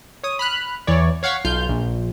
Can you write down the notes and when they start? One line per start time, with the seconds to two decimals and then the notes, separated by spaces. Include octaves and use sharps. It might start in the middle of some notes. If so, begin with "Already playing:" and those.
0.23 C#5 D#6
0.39 B5 F6 F#6
0.87 E2 E3 C#5 D5
1.23 C#5 F5 F#5 C#6 B6
1.45 B1 F4 F6 G6
1.69 A#1